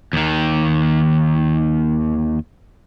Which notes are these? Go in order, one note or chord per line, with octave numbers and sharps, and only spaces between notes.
D#2 D#3